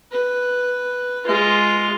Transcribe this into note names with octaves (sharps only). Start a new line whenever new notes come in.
B4
G#3 F4